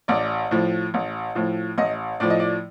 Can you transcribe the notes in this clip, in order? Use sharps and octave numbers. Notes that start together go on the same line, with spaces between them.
A1 D5
A2 F3
A1
A2 F3
A1 D#5
A2 F3 D5
D#5
D5